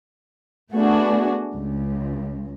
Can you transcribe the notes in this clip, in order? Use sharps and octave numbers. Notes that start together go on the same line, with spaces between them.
A3 B3 D4 F#4 G#4
C#2